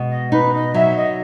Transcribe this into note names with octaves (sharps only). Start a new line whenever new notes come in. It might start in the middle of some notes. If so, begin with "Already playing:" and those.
Already playing: B2 G#3
D#5
D#4 B4
D#5
F#3 E5
D#5